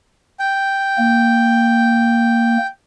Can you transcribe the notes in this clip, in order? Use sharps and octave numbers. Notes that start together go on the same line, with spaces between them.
G5
A#3